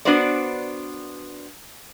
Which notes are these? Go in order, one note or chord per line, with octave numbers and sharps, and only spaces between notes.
B3 D4 F#4 B4 C5 D5